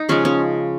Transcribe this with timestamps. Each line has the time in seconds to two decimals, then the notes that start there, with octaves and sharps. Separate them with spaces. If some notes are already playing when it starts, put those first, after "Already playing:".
Already playing: D#4
0.09 C#3 F3 G#3 C#4
0.25 C#4